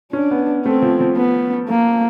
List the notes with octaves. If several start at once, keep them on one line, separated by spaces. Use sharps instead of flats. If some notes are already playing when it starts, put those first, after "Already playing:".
C#4 D4
B3
A3 C4
F3
F3
B3
A#3